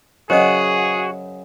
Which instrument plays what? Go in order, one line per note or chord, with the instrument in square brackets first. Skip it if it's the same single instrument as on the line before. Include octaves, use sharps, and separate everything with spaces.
[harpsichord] F#2 C#3 [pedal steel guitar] F#4 [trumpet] G#4 [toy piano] B4 C5 D#5